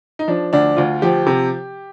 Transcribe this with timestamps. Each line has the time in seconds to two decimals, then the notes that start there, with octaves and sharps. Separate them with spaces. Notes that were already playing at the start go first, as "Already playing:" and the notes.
0.19 D#4
0.28 F3 D4
0.53 D2 D4
0.77 D2 F4
1.02 F3 G4
1.26 C3